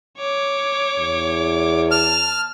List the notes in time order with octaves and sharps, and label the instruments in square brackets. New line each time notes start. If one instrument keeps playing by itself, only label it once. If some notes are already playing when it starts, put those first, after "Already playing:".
[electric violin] C#5 D6
[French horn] E2
[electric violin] A5 [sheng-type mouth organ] F6